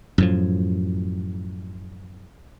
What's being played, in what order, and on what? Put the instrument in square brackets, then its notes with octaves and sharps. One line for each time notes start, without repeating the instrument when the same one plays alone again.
[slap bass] F#2 A2 F3